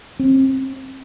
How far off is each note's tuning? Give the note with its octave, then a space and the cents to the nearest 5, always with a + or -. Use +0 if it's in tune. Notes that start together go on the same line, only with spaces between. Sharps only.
C4 +35